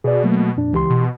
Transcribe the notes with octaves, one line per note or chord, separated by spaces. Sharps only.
B2 G#4 D5
F#3 A3 A#3
F2 A#2 D4
C#2 E3 G4 C6
B2